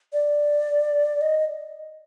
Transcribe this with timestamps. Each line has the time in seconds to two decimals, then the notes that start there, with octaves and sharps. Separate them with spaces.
0.13 D5
1.21 D#5